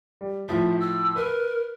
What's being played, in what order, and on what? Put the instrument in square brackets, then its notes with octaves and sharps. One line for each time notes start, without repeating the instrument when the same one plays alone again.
[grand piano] G3
[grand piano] A2 F3 [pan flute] E5
[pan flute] E6
[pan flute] A#4 [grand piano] B4